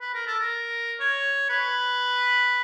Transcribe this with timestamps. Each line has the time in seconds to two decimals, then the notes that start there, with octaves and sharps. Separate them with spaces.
0.01 B4
0.14 A#4
0.27 A4
0.40 A#4
1.00 C#5
1.49 B4